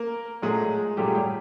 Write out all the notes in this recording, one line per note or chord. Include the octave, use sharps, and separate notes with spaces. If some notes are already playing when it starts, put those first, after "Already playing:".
Already playing: A#3 A#4
A#2 F#3 G#3 A3 G#4
A#2 F#3 G3 A3 G4
G#4
G3 G4